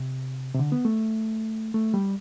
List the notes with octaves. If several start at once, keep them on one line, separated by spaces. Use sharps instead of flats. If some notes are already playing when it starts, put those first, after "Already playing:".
Already playing: C3
C3
D3
B3
A3
A3
G3